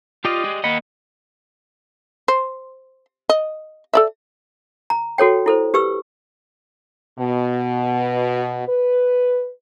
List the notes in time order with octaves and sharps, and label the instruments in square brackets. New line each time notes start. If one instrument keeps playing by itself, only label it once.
[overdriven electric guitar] F4 [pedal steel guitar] G4 D5 D#5
[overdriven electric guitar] G#3
[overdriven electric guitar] A#3 D#5 [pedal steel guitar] F#5 B5
[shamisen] C5
D#5
A4 D5 E5
[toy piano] A#5
F#4 A4 C#5 G5
E4 A4 C5
G4 B4 C#6 E6
[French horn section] B2
B4